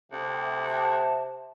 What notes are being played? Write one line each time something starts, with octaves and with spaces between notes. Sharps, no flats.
D2 C3
A5